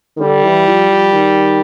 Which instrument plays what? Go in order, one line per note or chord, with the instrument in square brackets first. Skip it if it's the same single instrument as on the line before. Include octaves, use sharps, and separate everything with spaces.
[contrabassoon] D#3
[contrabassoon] D3 [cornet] G3
[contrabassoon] E3
F3
F3
D#3